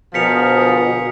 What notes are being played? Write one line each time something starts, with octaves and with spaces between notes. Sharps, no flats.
B2 D3 F3 G#4 A#4 B6 C#7 F7